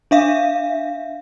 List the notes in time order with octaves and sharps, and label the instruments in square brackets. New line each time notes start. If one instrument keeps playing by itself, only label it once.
[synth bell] D4 E5 F5